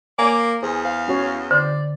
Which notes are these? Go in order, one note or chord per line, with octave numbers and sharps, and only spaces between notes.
A#3 C#5 G#5 D6
E2 G#4 C5
C5 F5
C#4 F#4 C#5
D3 C5 D5